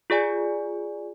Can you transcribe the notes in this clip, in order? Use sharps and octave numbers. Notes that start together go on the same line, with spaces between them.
F4 G#4 D5 G#5